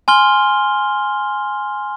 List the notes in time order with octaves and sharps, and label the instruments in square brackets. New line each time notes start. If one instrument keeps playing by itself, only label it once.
[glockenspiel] G#5 C6 F6 G7